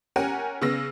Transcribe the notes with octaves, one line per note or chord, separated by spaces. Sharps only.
C#4 G4 A#4 F#5 G#5
C#3 B3 E6 A#6